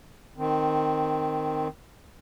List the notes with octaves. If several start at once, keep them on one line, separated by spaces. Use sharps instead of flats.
D#3 C4